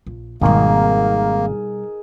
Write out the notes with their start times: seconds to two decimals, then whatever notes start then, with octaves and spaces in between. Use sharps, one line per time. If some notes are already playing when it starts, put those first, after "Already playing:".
0.07 A#1
0.41 G#1 B2 G3 A#3 D#4 G#4 A#4